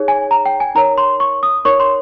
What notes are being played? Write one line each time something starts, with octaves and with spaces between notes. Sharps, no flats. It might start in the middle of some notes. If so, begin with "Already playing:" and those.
Already playing: D#4 G#4 C#5
G#5
A#5
G5
G#5
D#4 A#4 C#5 A#5
C6
C#6
D#6
D#4 A#4 C#5 C#6
C6